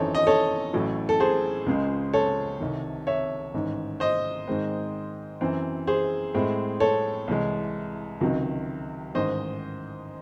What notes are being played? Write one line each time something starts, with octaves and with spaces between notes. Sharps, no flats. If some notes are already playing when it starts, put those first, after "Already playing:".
Already playing: G#1 F#2 E3 C4 D#4 A4 C#5
D#5
A4 C#5
A1 A2 F#3
A4
G#4 C5
C#2 C#3 G#3
A4 C#5
C2 C3 D#3
C#5 E5
A1 G#2 D#3
C5 D#5
G#2 D#3 G#3 C4
F#2 E3 C4
G#4 C5
A2 G#3 C4
A4 C#5
C2 C3 E3 G#3
C#2 C3 D#3 F#3
A1 G#2 D#3 C5 D#5